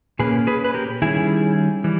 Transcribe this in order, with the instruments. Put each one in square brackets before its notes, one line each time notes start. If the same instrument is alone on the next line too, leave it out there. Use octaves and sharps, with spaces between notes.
[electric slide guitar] A#2 A#3 C#4 G#4 B4
G#4 B4
B4
G4 A#4
D#3 G3 C#4 E4 G#4
E3 G3